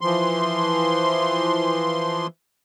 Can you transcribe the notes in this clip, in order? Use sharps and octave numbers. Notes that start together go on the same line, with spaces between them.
E3 F3 C6